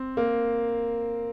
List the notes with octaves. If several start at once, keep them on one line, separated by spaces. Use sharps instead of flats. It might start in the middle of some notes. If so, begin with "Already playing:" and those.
Already playing: C4
A#3